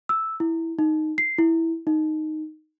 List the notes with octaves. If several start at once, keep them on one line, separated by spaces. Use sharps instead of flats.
E6
E4
D#4
C7
E4
D#4